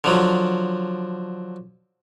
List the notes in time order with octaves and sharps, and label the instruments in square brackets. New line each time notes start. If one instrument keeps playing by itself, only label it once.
[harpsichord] D3 F3 F#3